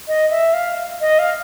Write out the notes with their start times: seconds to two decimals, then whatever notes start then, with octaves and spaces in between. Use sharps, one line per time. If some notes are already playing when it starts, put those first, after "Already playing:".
0.08 D#5
0.30 E5
0.54 F5
1.00 D#5
1.19 F5